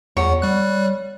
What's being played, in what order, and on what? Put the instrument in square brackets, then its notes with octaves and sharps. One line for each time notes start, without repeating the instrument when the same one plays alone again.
[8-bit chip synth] E2 F#5 [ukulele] C#5
[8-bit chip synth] G3 F#6